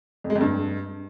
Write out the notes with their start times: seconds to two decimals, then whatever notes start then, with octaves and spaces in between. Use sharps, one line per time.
0.24 F2
0.30 G#3
0.35 F2
0.41 G2